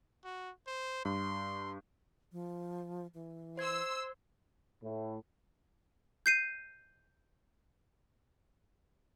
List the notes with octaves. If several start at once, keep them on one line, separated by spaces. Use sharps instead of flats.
F#4
C5
G2 C6
F3
E3
C5 C6 E6 G#6
A2
G6 C7 D#7